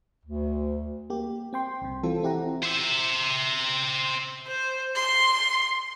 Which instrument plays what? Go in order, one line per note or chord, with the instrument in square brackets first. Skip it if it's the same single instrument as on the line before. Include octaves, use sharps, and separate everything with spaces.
[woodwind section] D2
[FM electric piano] A#3 G4
C4 G5 C6
C2 C3
E3 C4 F4 A4
C4 E4 G4 F#5 A#5
[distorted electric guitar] C5 E5
[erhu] C5
C6